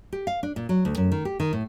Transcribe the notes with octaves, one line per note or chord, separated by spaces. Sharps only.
G4
F5
D4
A#2
F#3
D2
F#2
D#3
G4
D#3
A2